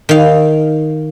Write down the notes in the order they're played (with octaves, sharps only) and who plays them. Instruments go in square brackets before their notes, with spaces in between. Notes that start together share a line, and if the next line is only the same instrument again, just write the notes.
[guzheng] D#3 F5